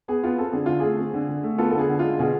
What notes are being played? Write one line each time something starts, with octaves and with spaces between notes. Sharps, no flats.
B3 G#4
B3 F4
C4 A4
D3 G#4
D3 F4
A3 G#4
C4
D3
D3
A3
B3 F4 A4
D3 A4
G#4
D3
G#3 F4
B2 G#4